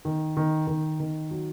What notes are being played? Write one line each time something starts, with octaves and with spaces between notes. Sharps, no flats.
D#3
D#3
D#3
D#3
F#3